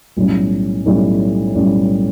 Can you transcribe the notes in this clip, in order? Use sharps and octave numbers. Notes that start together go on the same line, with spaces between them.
B1 A2 G3 C#4
B1 A2 G3 C#4
B1 A2 G3 C#4